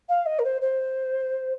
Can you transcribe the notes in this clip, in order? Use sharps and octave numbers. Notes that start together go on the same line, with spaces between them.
F5
D#5
A#4
C5
C5